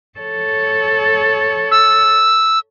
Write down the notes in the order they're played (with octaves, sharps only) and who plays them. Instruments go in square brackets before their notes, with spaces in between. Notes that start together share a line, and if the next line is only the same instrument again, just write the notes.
[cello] A4 C#5
[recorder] E6